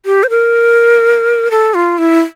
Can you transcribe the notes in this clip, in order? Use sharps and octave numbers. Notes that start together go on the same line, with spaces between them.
G4
C5
A#4
A4
F4
E4